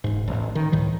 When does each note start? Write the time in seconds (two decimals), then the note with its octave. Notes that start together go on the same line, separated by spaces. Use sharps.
0.04 E1 G#2
0.28 A1
0.55 D#3
0.72 C#2 A2 D#3 E3